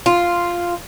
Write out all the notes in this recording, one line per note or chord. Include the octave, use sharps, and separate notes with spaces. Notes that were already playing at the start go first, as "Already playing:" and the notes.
F4